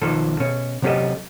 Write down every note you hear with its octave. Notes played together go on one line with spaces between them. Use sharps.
B1 D#3 F3 A4
B2 C#4
C3 F#3 C#4 G4 A4 D#5